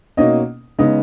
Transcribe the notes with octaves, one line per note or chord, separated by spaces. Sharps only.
B2 A#3 C#4 D#4 D#5
C#3 G#3 B3 D#4 D#5